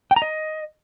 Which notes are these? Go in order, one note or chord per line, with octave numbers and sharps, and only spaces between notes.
G5
A#5
D#5